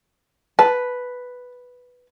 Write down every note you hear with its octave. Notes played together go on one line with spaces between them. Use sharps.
B4 A5